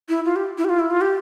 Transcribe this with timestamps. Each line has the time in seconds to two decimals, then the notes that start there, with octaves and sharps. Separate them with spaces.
0.09 E4
0.25 F4
0.36 G4
0.58 E4
0.65 G4
0.69 F4
0.79 E4
0.90 F4
1.01 G4